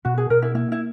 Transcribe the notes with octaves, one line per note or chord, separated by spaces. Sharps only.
B2 F#4
G#4
B2 A#4
E4
A#3 E4
E4